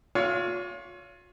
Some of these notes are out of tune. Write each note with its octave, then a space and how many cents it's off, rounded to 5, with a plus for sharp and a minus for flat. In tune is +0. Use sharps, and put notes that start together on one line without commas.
F4 +40 C#5 +30 F5 -30